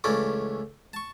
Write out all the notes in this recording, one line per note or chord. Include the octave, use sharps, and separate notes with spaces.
C#2 E3 A3 C#4 D5
A5 C#6